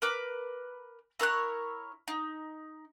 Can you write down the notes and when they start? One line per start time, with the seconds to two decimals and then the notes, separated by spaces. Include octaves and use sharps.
0.02 A#4 B4 D6
1.20 E4 A#4 C#5 F#6
2.08 D#4